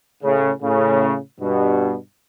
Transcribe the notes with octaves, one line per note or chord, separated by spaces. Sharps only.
A2 C#3
A2 C#3
G2 B2